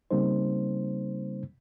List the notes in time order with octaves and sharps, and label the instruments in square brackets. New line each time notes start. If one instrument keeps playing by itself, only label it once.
[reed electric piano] C#3 G3 A#3 C4 D#4 C5